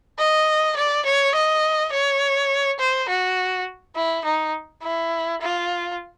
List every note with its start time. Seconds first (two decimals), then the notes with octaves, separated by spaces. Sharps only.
0.19 D#5
0.77 D5
1.06 C#5
1.35 D#5
1.93 C#5
2.80 C5
3.09 F#4
3.96 E4
4.25 D#4
4.83 E4
5.41 F4